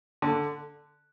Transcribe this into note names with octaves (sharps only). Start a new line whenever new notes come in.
D3